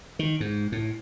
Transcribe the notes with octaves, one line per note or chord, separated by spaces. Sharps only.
D#3
G#2
A2